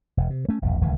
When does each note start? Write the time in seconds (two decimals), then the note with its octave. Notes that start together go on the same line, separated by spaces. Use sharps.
0.17 E1
0.30 C3
0.49 A3 C#4
0.62 E1 A#1 E2 G2
0.81 D1 C#2 D#3 E3